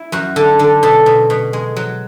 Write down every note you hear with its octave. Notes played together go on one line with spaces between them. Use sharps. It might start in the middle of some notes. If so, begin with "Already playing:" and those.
Already playing: E4
F#2 F#4
D3 A4
D3 A4
B2 A4
B2
B2
G#3
F#3